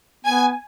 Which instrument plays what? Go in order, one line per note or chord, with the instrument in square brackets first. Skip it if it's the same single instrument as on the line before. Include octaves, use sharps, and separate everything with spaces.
[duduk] B3 [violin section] G#5